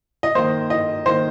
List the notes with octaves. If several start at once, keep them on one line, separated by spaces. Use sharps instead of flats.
D#5
D#3 A#3 C5
D#5
D#3 A#3 C5